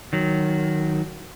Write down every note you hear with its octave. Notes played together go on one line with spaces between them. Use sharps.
D#3 F#3